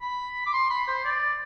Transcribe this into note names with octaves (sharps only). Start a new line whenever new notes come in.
B5
D6
C6
B5
C5
D5